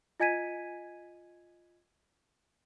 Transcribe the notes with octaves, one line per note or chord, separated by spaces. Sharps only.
F4 D#5 G#5 G#6 B6 D#7